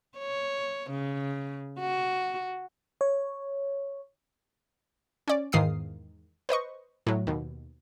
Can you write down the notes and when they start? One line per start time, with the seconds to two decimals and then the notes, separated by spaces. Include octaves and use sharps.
0.18 C#5
0.90 C#3
1.79 F#4
3.01 C#5
5.28 C#4 D5
5.52 E2 G#2 D#3 F5 D#6 C7
6.49 B4 C5 D#5 C#6
7.07 A2 F#3
7.27 D#2 B2